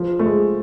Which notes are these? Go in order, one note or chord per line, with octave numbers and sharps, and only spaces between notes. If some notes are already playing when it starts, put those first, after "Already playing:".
Already playing: F3
A3
G#3